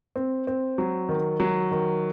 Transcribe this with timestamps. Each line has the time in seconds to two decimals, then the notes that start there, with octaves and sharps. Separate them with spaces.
0.16 C4
0.47 C4
0.78 F#3
1.09 D#3
1.40 F#3
1.71 D#3